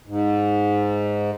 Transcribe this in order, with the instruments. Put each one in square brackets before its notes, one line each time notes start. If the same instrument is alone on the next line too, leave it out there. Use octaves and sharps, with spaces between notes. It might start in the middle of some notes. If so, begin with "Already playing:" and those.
[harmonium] G#2